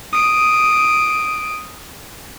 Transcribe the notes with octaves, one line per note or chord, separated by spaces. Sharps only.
D#6 D7